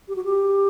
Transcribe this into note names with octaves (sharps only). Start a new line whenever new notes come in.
G4
F#4
G4